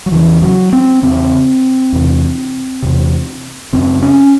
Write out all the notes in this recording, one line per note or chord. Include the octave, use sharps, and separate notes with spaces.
F#3
E2 C#3 E3
F#3
C4
E2 C#3 C4
E2 C3
E2 C3
F#2 C#3 C4
C#4